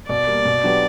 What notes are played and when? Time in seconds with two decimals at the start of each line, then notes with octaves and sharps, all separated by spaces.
0.09 B2 D5
0.27 G3 A#3
0.45 B2
0.63 F#3 B3 D4 G4